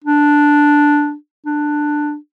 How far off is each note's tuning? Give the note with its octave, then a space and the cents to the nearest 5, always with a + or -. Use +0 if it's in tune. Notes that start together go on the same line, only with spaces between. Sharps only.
D4 +0
D4 +10